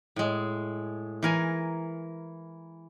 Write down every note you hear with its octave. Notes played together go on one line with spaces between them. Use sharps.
A2 G#3
E3 A#4 G#5